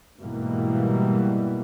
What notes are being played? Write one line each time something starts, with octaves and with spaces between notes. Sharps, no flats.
G#2 B2 E3 G3 A#3